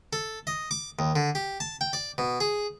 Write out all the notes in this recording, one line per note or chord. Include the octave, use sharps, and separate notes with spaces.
A4
D#5
D6
D#2
D3
G4
A5
G5
D5
B2
G#4